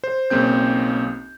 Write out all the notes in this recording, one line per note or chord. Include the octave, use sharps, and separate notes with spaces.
C5
B1 C#3 A#3 C4 G6